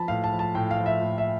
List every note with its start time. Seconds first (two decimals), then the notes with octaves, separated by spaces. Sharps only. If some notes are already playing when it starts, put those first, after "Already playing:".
Already playing: F3 A5 B5
0.08 A2 F5
0.24 A5
0.32 F3
0.39 A5
0.55 A2 G5
0.71 F5
0.79 F3
0.86 E5
1.02 A2
1.18 E5